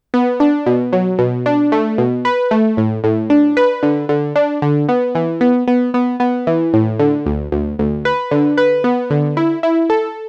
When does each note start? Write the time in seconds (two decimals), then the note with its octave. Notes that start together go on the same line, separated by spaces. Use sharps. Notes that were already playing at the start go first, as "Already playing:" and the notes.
0.14 B3
0.40 D4
0.66 B2
0.93 F#3
1.19 B2
1.46 D4
1.72 A3
1.98 B2
2.25 B4
2.51 A3
2.77 A2
3.04 A2
3.30 D4
3.57 B4
3.83 D3
4.09 D3
4.35 D4
4.62 D3
4.89 B3
5.15 E3
5.41 B3
5.67 B3
5.94 B3
6.20 B3
6.47 E3
6.73 A2
6.99 D3
7.26 D2
7.52 D2
7.79 D2
8.05 B4
8.31 D3
8.57 B4
8.84 B3
9.10 D3
9.37 E4
9.63 E4
9.90 A4